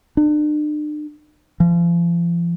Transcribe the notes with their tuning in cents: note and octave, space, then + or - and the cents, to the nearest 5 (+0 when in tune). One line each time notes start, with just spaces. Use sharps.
D4 +40
F3 -40